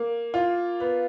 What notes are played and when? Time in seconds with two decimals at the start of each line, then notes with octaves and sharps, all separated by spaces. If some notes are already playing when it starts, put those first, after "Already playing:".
Already playing: A#3
0.34 F4
0.80 B3